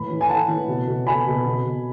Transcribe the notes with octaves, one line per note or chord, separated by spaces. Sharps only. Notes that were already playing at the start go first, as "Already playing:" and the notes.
Already playing: A2 E3 B5
E3
G#5
E3 F#5 A5
E3
B2
B2
B2 G#5 B5
B2
B2
B2